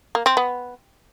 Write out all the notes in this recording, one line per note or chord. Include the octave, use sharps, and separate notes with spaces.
A#3
C4
B3